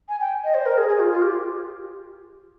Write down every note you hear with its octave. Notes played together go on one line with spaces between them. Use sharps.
G#5
G5
D#5
C5
A#4
G#4
G#4
F4
F4
G4